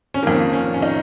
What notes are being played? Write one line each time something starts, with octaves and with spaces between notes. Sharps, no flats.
C#4
F2 D#3 A#3
C#4
C#4
D#4